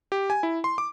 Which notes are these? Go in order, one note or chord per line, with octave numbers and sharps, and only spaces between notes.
G4
G#5
E4
C6
D6